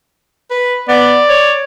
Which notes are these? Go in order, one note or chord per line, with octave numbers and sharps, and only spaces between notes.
B4
B3 D5
C#5